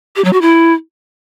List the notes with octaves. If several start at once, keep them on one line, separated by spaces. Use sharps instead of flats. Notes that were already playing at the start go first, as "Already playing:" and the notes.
G4
F#3
F#4
E4